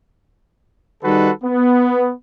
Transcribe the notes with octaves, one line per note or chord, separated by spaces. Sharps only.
D#3 G3 D#4 F#4 A4 B4
B3